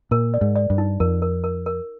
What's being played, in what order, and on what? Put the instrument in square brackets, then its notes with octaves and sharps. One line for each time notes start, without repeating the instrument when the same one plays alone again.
[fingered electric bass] A#2 [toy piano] A#4
[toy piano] D5
[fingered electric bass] G#2
[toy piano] D5
[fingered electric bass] G2
[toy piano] D#4
[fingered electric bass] F2 [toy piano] A#4
[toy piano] A#4
A#4
A#4